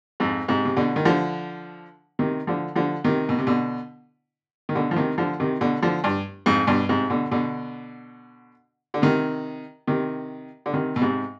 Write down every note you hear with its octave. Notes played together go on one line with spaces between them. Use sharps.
F2 G#2
G#2 C3
C3
B2 D3
D#3
D3 F3
C3 D#3
D3 F3
D3 F3
C3 D#3
B2
C3
B2 D3
D#3
B2 D3
F3
C3 D#3
D3 F3
C3 D#3
B2 D3
D3 F3
G2
F2 G#2
G2 B2
G#2 C3
B2 D3
B2 D3
D3
C3 D#3
C3 D#3
D3
C3 D#3
B2
G#2 C3